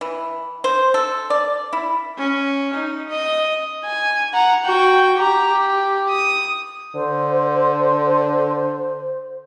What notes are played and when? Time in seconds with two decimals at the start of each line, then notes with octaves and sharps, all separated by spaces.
0.01 E3
0.64 C5
0.94 A4
1.30 D5
1.73 E4
2.18 C#4
2.74 D#4
3.10 D#5
3.85 G#5
4.33 F#5 A#5
4.65 F#4 G5
5.17 G4 A#5
5.51 G4
6.10 D#6
6.95 D3 C5